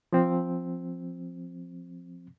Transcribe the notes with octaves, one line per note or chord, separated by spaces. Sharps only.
F3 C4